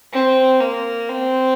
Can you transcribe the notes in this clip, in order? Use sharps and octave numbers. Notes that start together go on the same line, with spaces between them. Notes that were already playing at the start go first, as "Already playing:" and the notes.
C4
A#3
C4